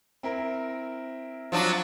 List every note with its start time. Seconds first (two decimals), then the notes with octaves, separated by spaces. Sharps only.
0.23 C4 E4 A#4
1.52 F3 F#3 D4